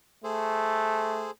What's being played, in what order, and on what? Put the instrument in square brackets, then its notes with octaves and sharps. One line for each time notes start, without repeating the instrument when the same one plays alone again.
[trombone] A3 [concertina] G#4 A4 C5